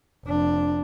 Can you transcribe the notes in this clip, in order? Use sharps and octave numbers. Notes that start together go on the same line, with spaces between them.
F1 D4